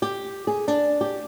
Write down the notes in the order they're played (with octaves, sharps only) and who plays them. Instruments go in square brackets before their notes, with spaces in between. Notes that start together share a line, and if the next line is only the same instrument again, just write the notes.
[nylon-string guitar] G4
G#4
D4
G4